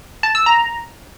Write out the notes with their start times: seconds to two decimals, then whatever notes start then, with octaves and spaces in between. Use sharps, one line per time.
0.23 A5
0.35 E6
0.46 A#5